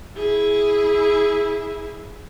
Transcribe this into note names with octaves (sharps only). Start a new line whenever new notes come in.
E4 G#4